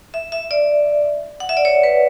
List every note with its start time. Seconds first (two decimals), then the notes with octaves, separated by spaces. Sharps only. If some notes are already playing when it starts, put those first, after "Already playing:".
0.14 E5
0.32 E5
0.51 D5
1.40 F#5
1.49 E5
1.57 D5
1.65 C#5
1.83 B4